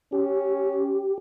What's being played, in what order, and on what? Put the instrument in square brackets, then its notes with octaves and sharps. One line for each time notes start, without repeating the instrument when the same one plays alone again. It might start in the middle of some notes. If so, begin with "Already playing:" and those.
[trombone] C#4 [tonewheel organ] G4